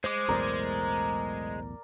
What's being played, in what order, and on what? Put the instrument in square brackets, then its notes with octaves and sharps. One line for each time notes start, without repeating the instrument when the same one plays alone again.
[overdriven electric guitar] G#3 [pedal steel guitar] C5 D6
[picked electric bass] B1 E2 A2 [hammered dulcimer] A#4 D5